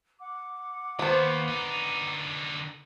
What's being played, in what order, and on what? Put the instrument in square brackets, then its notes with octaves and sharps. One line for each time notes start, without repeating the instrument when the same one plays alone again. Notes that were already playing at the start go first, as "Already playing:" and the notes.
[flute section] F#5 D6
[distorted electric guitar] D#2 [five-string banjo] B3 C5
[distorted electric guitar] D3 D#4